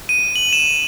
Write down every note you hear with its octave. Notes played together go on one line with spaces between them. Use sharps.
D#7
F#7
E7